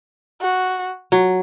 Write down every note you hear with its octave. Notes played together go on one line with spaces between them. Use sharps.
F#4
F#3